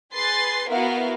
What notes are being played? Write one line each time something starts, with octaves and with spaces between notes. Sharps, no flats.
G#4 B4 C6 A6 C7
B3 E4 F#4 A#4 F5